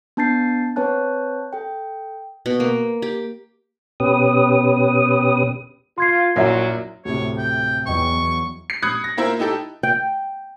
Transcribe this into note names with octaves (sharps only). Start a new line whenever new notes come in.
B3 D4 A5 G6 A6 C7
C4 B4 C#5 A5 F#6
A4 G5
B2
A#3
G4
B2 C#4 G4 B4 D#6
F4 C6 G#6 C7
A#1 F#2 F#3 E4
D2 A2 C3 C#5
G5
E2 F#3 D#5 G5 C#6
C7
B5 D#6 F#6 G#6 C#7
A#6
A#3 E4 F4 A#4 C5 E5
D#4 E4 G4 A4
G5